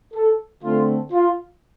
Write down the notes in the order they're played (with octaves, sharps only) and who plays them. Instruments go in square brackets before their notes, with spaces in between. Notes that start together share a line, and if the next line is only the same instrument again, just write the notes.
[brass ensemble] A4
D3 A3 C4 F4
F4